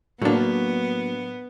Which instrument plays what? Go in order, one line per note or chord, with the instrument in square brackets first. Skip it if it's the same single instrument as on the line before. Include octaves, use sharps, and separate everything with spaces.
[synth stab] A2 D4 [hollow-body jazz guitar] F#3 A#3 [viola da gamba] B3